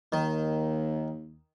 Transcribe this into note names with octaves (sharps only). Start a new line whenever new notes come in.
D#2 D#3